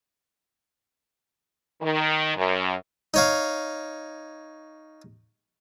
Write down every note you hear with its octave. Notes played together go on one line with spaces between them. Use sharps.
D#3
F#2
D#4 C#5 F5